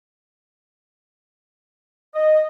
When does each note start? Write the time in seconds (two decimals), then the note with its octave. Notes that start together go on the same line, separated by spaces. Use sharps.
2.13 D#5